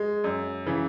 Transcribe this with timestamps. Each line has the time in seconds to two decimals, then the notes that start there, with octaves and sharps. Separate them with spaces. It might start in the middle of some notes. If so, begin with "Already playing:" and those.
Already playing: G#3
0.24 F#2
0.66 C#3 E3